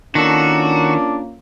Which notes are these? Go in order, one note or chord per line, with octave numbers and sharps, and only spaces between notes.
D#3 A#3 C#4 D4 F4 F#4 A4